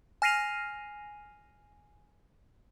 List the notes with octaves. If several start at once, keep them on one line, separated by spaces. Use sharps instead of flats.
G#5 F6 A#6 C7 D#7 F7